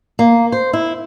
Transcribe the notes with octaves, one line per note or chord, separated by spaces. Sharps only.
A#3
C5
E4